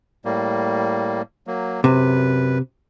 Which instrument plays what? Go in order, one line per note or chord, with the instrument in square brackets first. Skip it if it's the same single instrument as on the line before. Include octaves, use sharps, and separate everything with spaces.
[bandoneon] A2 G3 A#3
F#3 A#3
[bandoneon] F#2 B4 [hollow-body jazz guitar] C3